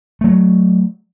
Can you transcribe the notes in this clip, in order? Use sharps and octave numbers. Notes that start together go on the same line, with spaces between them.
F#3 A3